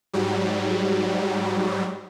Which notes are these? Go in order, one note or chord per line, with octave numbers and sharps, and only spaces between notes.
G#2 F#3 G3